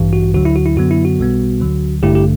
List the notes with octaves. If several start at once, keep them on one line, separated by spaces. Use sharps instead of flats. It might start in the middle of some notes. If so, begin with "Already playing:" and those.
Already playing: A1 G2 E3
F#4
D2 D3 F#3 F#4
E4
F#4
E4
F#2 D3 F#3 B3 F#4
E4
F#4
B1 B2 G3 B3
D2 D3 F#3
A1 G2 D3 A3 E4 G4
G4